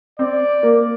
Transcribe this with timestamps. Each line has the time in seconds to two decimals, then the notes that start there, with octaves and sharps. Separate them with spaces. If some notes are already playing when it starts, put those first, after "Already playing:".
0.19 C4 D5
0.63 A#3